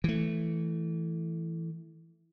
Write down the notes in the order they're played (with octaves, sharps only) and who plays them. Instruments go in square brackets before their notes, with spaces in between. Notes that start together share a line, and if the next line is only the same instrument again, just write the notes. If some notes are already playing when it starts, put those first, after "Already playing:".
[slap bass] E3 A3